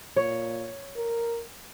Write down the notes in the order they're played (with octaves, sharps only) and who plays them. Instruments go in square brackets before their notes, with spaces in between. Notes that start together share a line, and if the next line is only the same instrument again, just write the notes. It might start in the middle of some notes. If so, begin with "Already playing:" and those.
[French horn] A#2 [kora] C#5
[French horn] A#4